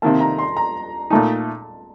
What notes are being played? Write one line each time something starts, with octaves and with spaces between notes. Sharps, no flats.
C3 D#3 A#3 A5
A#5
C6
A#5
A#2 A3 D#4 A5